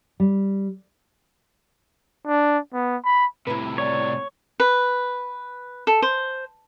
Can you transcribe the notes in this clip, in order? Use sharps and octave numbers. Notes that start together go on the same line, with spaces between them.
G3
D4
B3
B5
A2 C3 E4 B4
C#5 D5
B4
A4
C5